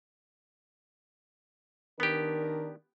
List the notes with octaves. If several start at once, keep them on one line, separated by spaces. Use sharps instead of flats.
D#3 B3 D4 G4 A#4